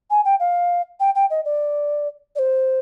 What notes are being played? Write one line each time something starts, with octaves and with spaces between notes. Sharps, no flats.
G#5
G5
F5
G5
G5
D#5
D5
D5
C5